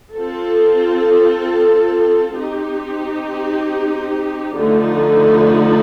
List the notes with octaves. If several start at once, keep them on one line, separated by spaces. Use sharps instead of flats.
C4 F4 A4
C4 D#4 G4
D3 F3 A3 D#4